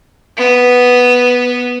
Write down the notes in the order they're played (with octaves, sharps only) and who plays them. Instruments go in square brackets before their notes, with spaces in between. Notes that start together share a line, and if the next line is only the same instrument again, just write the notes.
[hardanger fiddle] B3